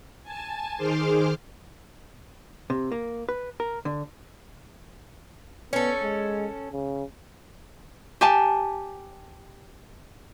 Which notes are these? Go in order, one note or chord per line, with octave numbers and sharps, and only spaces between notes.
G#5 A5
D#3 G#4 C5 C6 D6 F6
C3
A#3
B4
A#4
D3
B3 C#4 A4
G#3
C#3
G4 G#5 A5